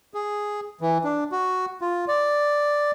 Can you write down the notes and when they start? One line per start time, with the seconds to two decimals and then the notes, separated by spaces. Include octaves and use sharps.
0.14 G#4
0.81 E3
1.04 D4
1.32 F#4
1.81 F4
2.08 D5